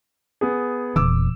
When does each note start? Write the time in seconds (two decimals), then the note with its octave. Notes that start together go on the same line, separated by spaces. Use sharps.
0.41 B3 G#4
0.96 D#1 E2 D6 E6